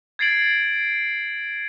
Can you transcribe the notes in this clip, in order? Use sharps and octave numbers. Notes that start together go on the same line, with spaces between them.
G#6 A6 C7 D7 F#7